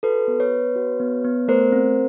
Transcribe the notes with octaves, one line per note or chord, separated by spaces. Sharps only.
F#4 A4 B4
B3
B4 C#5
B3
F#4
B3
B3
A3 A#4 C5
C4